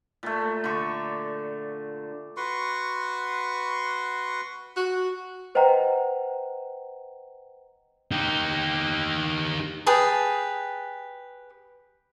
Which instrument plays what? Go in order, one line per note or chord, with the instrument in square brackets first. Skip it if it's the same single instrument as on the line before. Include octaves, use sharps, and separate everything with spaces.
[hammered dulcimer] A#2 A3
D3 C#6
[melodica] F#4 B4 C6 C#6
[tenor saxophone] F#4
[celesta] B4 C5 D#5 F#5 G5 A#5
[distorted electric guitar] D#4 G4
[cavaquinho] G4 G#4 B4 A5